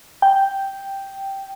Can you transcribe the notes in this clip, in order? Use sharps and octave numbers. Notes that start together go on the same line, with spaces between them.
G5